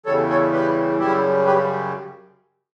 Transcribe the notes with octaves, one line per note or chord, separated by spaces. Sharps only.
E2 C#3 E3 G3 A4 C#5
A4 C#5
G4 B4
F#2 C#3 G3 E4 G4
G4 B4